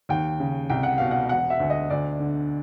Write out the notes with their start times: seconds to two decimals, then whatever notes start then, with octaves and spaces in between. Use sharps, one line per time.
0.09 D#2 G5
0.40 C#3
0.70 C2 G5
0.83 F#5
0.98 B2 F5
1.11 F#5
1.29 E1 F#5
1.50 E5
1.60 D2
1.70 D#5
1.90 D2 D5
2.20 D3